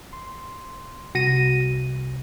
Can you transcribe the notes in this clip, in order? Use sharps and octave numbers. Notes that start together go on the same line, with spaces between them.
C6
C2 F#4 A#6 D#7